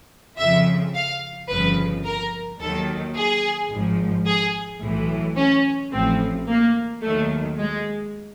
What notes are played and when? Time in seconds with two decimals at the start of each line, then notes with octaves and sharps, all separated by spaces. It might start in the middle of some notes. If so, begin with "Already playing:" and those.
0.38 F2 C#3 F3 E5
0.94 F5
1.49 G1 F2 C#3 F3 B4
2.05 A#4
2.59 D#2 D#3 F#3 A4
3.16 G#4
3.71 G#1 G#2 F3
4.27 G#4
4.81 B1 A2 E3
5.36 C#4
5.92 A1 A2 F3 C4
6.48 A#3
7.02 D#2 D#3 F#3 A3
7.58 G#3